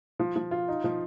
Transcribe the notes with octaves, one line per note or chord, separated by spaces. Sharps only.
F3
F3
F4
D#4
F3